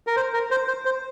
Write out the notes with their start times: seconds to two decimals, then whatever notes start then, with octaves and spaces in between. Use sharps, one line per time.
0.07 A#4
0.16 C5
0.34 A#4
0.51 C5
0.68 C5
0.85 C5